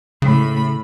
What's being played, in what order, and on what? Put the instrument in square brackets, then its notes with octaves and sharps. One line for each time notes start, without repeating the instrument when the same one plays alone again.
[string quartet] A2 B5 [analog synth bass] C#3